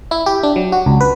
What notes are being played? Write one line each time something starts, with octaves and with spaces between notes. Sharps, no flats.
E4
G4
D4
F#3
F#4
C#2
B4